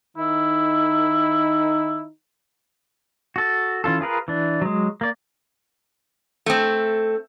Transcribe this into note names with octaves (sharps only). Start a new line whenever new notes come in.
D#3 D#4 E4
F#4 A4
E3 C#4 F4 A4
F4 G#4 A#4 B4
E3 D4
F#3 G#3
A#3 D5
A3 C4